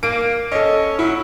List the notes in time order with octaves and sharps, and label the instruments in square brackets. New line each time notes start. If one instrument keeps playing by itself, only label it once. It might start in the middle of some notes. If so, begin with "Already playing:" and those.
[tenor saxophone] A#3 [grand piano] D7
[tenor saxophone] C#4 [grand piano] A4 D#5
[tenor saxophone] F#3 [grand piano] E4